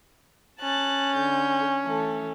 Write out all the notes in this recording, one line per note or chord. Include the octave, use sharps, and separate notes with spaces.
C#4 A5 F#6 A6
D3 G6
E3 A3 A4